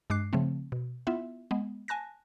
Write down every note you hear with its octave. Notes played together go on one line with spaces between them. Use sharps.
G2 G#3 D6 F#6 C7
C#3 F3 A3 C4
B2
B3 E4 F4 E5
G#3 B3
G#5 A5 F#6 A#6